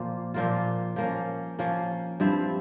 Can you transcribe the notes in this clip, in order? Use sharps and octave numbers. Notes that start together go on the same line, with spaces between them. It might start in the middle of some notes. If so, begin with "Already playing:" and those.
Already playing: A#2 F3 A#3 F4
A#2 F3 A#3 F4
F3 A#3 C#4
F3 A#3 C#4
G2 F3 C4 E4